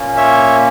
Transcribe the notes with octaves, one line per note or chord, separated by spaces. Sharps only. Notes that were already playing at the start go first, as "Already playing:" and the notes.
Already playing: A#2 A#3 C#4
C#5 E5